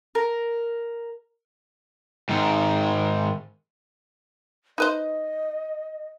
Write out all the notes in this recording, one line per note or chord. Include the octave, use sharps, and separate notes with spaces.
A#4
G#2 D#3
D#4 B4 C5 D#5